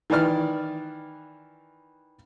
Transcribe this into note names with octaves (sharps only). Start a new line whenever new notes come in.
D#3 E3 B4 D5 F6